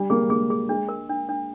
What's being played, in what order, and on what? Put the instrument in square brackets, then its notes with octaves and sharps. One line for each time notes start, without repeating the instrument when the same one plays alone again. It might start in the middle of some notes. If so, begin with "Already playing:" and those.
Already playing: [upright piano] G3 [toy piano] D4
[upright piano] A#3 [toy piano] G#4
[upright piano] A#3 [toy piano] G#4
[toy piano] G#4
[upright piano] G#3 [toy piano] D4
[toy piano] A#4
D4
D4